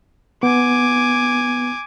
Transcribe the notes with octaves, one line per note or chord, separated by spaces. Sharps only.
B3 G#5 D6